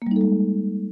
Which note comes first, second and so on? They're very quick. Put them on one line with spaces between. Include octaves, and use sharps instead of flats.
A#3 G3 D#4 A4 G#3